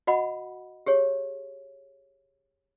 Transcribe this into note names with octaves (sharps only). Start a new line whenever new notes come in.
F#4 D#5 F#5 B5
G4 G#4 C#5